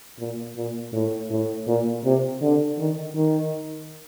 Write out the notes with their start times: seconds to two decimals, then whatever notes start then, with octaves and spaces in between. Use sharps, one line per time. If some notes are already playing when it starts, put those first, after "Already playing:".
0.19 A#2
0.56 A#2
0.93 A2
1.30 A2
1.67 A#2
2.04 C3
2.42 D3
2.79 D#3
3.15 D#3